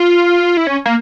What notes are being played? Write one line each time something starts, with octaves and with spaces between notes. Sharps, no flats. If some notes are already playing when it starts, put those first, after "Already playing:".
Already playing: F4
E4
C#4
A#3